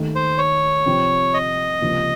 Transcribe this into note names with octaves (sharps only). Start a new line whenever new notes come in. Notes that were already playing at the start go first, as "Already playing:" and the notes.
Already playing: D#2 D#3 A3 D#4
C5
C#5
C3 F3 C4
D#5
C#2 C3 F3 A#3